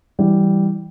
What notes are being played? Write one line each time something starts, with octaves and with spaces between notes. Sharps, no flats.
E3 G3